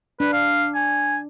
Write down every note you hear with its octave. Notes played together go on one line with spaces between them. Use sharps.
D4 B4
F5
G#5